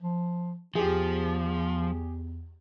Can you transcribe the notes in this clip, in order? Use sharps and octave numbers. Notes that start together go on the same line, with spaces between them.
F3
E2 F3 G4 G#4